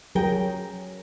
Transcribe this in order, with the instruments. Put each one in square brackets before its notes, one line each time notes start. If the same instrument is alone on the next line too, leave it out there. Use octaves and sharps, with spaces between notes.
[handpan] F#3 [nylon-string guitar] G#4 A#4 G5